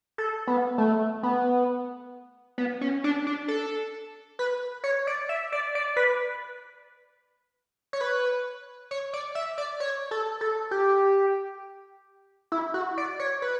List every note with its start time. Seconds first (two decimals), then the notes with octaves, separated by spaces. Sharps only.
0.18 A4
0.47 B3
0.78 A3
1.23 B3
2.58 B3
2.81 C#4
3.04 D4
3.27 D4
3.48 A4
4.39 B4
4.84 C#5
5.07 D5
5.29 E5
5.52 D5
5.75 D5
5.96 B4
7.93 C#5
8.01 B4
8.91 C#5
9.13 D5
9.35 E5
9.58 D5
9.80 C#5
10.11 A4
10.41 A4
10.71 G4
12.52 E4
12.74 F#4
12.97 D5
13.20 C#5
13.42 B4